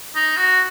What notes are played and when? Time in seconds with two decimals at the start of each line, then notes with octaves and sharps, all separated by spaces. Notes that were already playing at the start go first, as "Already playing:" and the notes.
0.15 D#4
0.37 F#4